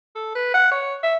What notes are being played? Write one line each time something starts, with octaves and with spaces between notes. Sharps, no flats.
A4
B4
F#5
C#5
E5